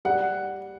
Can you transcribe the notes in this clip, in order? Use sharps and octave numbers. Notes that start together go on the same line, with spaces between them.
G3 F#5